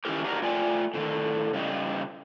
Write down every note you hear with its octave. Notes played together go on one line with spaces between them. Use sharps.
D#3 C#4 E4 G4 A#4
D4 D#4 F#4 G4 A#4
A3 F4 D5 G5 G#5
A2 D3 D#3
C#3 G3 D#4